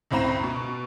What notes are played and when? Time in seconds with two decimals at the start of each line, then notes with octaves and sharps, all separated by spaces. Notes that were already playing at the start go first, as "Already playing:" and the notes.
0.11 C#2 A2 C4 A#5 E7
0.43 B2